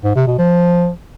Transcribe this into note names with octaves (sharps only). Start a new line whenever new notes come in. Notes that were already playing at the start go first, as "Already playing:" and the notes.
G#2
C3
B2
F3